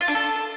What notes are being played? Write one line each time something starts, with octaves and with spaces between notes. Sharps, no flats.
F4
D4
A4